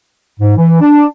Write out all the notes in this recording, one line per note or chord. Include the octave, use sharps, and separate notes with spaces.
G#2
E3
D4